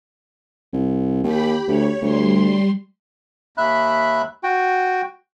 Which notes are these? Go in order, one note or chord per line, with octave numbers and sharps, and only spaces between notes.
C2
D#2 G4 B5
D2 C#5
D2 G3 C6
D#2 E5 B5 F#6
F#4 G5